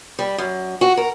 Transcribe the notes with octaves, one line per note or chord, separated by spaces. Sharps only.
G3
F#2
F#4
A#4